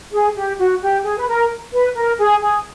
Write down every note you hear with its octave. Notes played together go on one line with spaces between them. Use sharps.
G#4
G4
F#4
G4
G#4
B4
A#4
B4
A#4
G#4
G#4